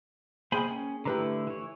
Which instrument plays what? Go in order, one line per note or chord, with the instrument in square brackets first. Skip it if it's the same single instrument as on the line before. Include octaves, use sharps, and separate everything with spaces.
[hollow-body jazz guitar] A#3 G#4 G5 [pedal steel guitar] C5 G#5 B5
[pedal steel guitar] C#4
[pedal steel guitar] D3 A3 E4 [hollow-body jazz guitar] G4 B4 A#5
[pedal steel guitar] E3 C#5